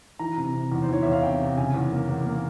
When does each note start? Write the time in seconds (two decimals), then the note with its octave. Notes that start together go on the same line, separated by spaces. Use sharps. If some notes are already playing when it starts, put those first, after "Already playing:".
0.19 E3 A#5
0.37 C3
0.54 C3
0.72 E2
0.82 C5
0.89 E3 C#5
1.03 E2 E5
1.13 F5
1.23 C3 G5
1.40 C3
1.57 C#3 G#5
1.74 E2
1.91 A#3
2.09 E2
2.26 A#3